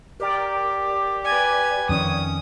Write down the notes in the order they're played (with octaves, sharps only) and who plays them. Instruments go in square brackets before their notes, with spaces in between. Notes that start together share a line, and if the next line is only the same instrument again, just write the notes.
[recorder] G4 [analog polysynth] A#4 D5 G5
[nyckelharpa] B4 G#5 [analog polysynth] D5 G5 G#6
[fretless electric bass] F2 D#3 [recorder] C#4 [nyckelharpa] D#6